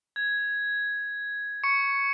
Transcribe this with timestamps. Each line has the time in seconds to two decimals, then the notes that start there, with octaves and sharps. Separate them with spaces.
0.16 G#6
1.64 C#6 C#7